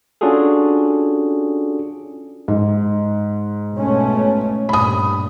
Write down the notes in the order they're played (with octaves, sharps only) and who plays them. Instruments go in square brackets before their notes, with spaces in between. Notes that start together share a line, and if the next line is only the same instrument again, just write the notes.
[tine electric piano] C#4 D4 F4 F#4 G#4 A4
[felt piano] G#2
[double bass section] B2 A3 C#4
[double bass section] G2 A#2 [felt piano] B5 D#6